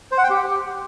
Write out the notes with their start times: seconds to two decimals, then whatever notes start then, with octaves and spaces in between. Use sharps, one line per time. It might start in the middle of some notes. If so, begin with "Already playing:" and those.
0.12 C5
0.18 F#5
0.24 G5
0.30 G4